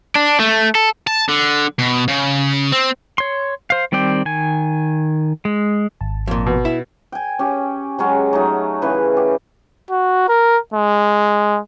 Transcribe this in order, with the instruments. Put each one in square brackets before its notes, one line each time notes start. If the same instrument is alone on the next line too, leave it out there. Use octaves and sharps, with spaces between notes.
[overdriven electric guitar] D4
A3
A4
[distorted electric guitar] A5
D3
B2
C#3
C4
[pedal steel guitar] C#5 C6
C5 F5
D#3 G3 C4 D5 G5
D#3 G#5
G#3
[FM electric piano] G#1 A5
[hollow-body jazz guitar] F2 A#2
[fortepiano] B2
[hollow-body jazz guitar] E4
[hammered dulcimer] G5 G#5
C#4 G4
F#3 G#3 C#4 F#4
F#3 A3 D#4
C#3 E3 B4
G4
[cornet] F#4
A#4
G#3